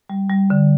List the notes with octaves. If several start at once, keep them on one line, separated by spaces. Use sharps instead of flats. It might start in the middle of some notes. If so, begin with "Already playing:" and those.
G3
G3
D3